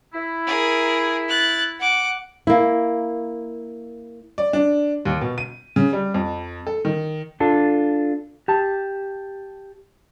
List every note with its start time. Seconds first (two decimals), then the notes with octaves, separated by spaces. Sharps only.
0.14 E4
0.47 G#4 A#4
1.29 F#6 A6
1.79 F#5 D6
2.47 A#3 E4
4.38 D5
4.53 D4
5.05 D#2
5.21 B2
5.38 D#7
5.76 C#3
5.93 G3
6.14 F2
6.67 A4
6.85 D#3
7.40 D4 F4 A4
8.48 G4 A5